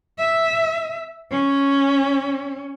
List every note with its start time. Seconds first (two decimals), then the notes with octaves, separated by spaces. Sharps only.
0.18 E5
1.31 C#4